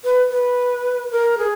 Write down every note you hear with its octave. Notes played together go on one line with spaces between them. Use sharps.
B4
B4
A#4
G#4